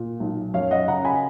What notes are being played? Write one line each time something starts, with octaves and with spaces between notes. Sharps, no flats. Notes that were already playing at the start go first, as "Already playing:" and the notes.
Already playing: A#2
B1
F#2 C#5 F5
D#5 F#5
C#3 F#5 A#5
G#5 B5